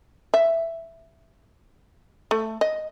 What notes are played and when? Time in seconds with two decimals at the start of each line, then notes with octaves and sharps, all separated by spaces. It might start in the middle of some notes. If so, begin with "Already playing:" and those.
0.34 E5
2.31 A3
2.61 D#5